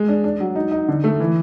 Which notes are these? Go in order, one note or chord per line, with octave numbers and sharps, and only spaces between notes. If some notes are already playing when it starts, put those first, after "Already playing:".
Already playing: G#3
D4
D4
F#3
D#4
D#4
D3
A3
E3